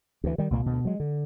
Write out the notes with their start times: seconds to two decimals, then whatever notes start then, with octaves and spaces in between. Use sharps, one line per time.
0.24 D2 E3
0.38 D#3 G3
0.51 C2 A#2 G3 A#3
0.66 D2 B2
0.85 F#3 G#3
1.00 D3